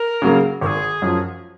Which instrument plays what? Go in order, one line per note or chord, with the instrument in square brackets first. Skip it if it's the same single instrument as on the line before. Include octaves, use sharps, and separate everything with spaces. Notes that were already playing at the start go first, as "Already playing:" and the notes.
Already playing: [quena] A#4
[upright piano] C#3 F#3 A#3
[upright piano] G#1 [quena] A#4
[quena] G#4
[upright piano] F#2 F3